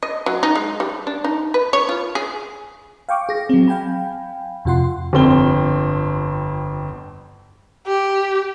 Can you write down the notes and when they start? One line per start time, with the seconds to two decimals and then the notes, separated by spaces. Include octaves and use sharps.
0.03 D#5
0.26 F#3
0.43 D#4
0.55 G#3
0.80 G3
1.07 D4
1.24 D#4
1.54 B4
1.73 C#5
1.89 F4
2.15 G#4
3.09 F5 G5 C#6 D6
3.29 G#4 A#6
3.49 F#3 C4
3.68 F5 G5 G#5 B5
4.65 F2 C3 F4 F#5 C6
5.13 G1 F2 C4 G7
7.87 G4